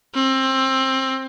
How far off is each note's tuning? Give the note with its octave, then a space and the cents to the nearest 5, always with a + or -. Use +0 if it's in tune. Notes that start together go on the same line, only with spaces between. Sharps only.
C4 +20